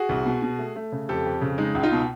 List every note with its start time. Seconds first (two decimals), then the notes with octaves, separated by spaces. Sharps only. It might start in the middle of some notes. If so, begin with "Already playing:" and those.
Already playing: F#4 G#4
0.09 C2
0.26 B2
0.42 B2
0.59 A3
0.76 A3
0.92 C#3
1.09 F2 G4 A4
1.26 F2
1.41 C#3
1.58 G#3 D#4
1.75 C#2
1.83 D#4 F4
1.92 B2